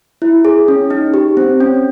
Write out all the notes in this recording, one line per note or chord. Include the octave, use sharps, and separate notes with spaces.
E4
G#4
C#4
D#4
G4
C4
C#4